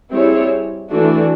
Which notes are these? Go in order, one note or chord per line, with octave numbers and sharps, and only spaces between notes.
G3 C4 E4 G#4 C#5
E3 A3 D4 F#4